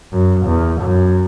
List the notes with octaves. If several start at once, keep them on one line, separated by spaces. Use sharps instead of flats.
F#2
E2
F#2